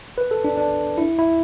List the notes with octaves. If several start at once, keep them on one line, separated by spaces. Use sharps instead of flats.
B4
A4
D4
D4
E4
E4